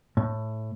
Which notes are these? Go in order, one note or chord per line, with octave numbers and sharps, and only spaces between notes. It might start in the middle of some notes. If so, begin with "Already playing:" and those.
A2